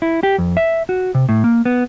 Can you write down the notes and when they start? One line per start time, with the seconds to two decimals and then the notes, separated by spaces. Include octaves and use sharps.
0.02 E4
0.23 G4
0.38 F2
0.57 E5
0.89 F#4
1.15 C3
1.29 A2
1.44 A#3
1.65 B3